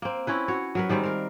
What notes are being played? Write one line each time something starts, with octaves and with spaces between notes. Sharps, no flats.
A#3 C4
C4 C#4 E4 B4
F#4 C#5
F#3 A#4 B4
D#3 G3 G#3 C4
A#4 F5